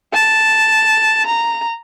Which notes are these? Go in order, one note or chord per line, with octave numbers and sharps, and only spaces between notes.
A5
A#5